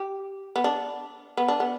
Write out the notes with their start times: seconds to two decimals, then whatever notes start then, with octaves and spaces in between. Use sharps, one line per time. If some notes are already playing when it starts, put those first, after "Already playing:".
Already playing: G4
0.56 B3
0.64 D4
1.37 B3
1.48 D4
1.60 B3